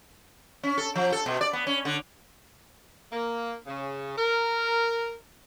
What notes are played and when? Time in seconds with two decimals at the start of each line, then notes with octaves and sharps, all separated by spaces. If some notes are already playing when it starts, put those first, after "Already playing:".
0.63 C#4
0.78 A4
0.95 F3
1.12 A4
1.26 B2
1.41 D5
1.53 B3
1.67 C#4
1.85 D3
3.12 A#3
3.67 C#3
4.18 A#4